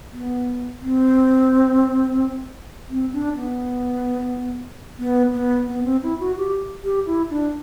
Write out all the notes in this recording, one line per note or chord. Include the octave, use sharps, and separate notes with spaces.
B3
C4
C4
D4
B3
B3
B3
B3
C4
E4
F#4
G4
G4
E4
D4